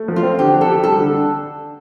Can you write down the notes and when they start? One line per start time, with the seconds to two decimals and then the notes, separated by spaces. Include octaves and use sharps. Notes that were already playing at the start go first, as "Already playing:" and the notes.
Already playing: A3
0.08 F3
0.16 F4
0.23 C4
0.38 D3 G4
0.54 D4
0.61 A4
0.68 G4
0.83 G3 A4
0.98 D3
1.13 D4